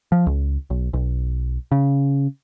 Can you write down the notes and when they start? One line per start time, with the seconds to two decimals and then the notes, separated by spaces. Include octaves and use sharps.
0.12 F3
0.26 C#2
0.70 B1
0.93 B1
1.72 C#3